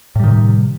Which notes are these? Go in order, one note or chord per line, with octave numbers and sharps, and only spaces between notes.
A2 C3 D#3 G3